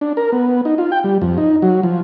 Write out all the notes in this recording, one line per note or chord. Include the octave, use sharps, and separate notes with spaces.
D4
A#4
B3
D#4
F4
G5
G3
F2
D#4
F#3
F3